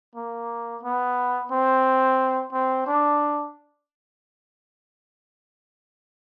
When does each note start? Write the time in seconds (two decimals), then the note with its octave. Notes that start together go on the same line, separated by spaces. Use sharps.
0.15 A#3
0.83 B3
1.51 C4
2.53 C4
2.86 D4